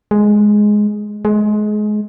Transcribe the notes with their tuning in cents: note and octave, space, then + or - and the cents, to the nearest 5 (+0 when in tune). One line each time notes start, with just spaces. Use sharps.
G#3 +5
G#3 +25